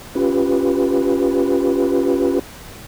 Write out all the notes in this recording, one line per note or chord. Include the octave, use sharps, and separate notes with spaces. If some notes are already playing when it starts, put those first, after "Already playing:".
C#4 F4 G4 B4